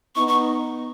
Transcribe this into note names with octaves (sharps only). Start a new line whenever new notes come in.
B3 D#4 C#6
C#6